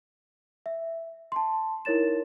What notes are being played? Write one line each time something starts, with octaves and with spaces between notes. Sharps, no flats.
E5
A5 C6
D#4 E4 A#4 C#5 A6 E7